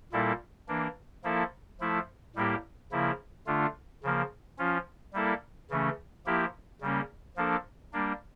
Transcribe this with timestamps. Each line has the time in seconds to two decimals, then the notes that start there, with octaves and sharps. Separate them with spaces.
0.12 A#2 G3 A#3 E4 A4
0.68 E3 A#3 D4
1.24 F3 A#3 E4 A4
1.80 F3 A3 E4 A4
2.36 A2 G3 A#3 E4 G4
2.92 C#3 F3 A#3 E4
3.47 D3 A3 D4 F4
4.03 C#3 F3 A#3
4.58 F3 C#4 F4
5.13 G3 A#3 E4 A4
5.70 C#3 E3 A3 C#4
6.26 F3 A#3 E4 G4
6.81 C#3 G3 A#3 C#4
7.36 F3 A#3 D4 A4
7.93 G3 A#3 D4